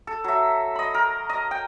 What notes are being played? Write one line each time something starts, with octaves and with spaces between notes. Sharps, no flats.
A4
F#3 E5
D#5 B5
A#4
D#5
G5